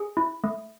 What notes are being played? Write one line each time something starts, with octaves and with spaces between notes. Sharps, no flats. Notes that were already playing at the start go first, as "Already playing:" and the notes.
Already playing: G#4
E4
A3